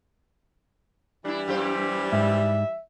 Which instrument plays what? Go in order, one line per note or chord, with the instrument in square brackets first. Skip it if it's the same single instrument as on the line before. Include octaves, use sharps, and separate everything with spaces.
[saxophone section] E3 G3 [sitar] D4 E4
[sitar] F#2 G4 C5
[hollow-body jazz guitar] G#2 [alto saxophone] E5